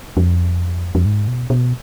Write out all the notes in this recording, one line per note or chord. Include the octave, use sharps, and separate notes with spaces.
F2
F2
G#2
B2
B2